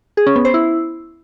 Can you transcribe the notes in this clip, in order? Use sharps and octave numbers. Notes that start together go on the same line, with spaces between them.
G#4
C#4
B3
C5
E4